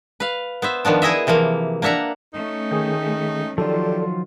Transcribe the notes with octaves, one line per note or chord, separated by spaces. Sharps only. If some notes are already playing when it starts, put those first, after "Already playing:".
B4 F5
B3 C5 E5
D#3 F3 B3 D4
E4 G#4 D#5 E5
C3 E3 F3 A#3
A#3 D4 E5 F#5 A#5
A3 C#4 D#4
D#3 G#4 G5
D#3 F3 F#3 F4 G4 A4 D5